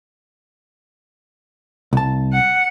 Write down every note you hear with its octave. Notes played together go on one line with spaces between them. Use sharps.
C2 A5
F#5